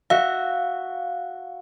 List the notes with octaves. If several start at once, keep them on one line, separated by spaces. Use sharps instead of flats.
F#4 E5 F5